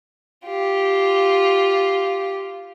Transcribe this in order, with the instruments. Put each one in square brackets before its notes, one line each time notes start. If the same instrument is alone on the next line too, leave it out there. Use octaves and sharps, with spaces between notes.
[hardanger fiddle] F4 G4